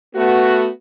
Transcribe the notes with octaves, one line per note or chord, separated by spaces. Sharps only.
A3 B3 F#4